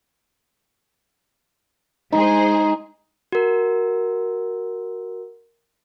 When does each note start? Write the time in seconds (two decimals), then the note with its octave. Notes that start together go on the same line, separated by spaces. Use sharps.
2.12 G#3 D#4 G#4 C5
3.32 F#4 A#4